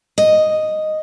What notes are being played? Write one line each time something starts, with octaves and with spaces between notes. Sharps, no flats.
D#5